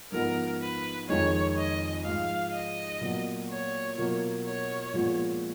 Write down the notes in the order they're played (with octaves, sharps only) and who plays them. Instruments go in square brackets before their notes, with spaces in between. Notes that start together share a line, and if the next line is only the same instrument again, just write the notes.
[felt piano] G#2 F3 B3 D#4 [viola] A#4
[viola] B4
[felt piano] F2 D#3 G#3 D#4 [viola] C#5
[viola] D#5
[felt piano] G#2 F3 G#3 [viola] F5
[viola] D#5
[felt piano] A#2 F#3 B3
[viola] C#5
[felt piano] B2 F#3 A#3 F4
[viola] C#5
[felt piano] A#2 F3 G#3 B3 F4